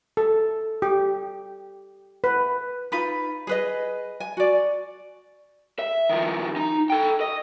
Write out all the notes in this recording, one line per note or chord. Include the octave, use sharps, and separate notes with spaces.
A4
G4
B4
D#4 F4 B4 B5
G#4 B4 D#5
G#5
F#4 D5
E5
D#3 F3
D#4
A4 G5
D#5